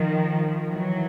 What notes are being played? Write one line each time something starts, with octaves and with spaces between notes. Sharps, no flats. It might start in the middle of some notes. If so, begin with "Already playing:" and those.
Already playing: D#3 F3
E3 F#3